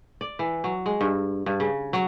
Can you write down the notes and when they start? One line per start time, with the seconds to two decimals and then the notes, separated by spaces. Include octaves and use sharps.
0.21 D5
0.39 E3
0.64 F#3
0.86 G#3
1.01 G2
1.46 G2
1.60 C#3
1.93 F#3